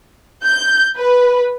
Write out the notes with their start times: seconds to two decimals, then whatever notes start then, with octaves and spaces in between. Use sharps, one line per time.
0.44 G6
0.97 B4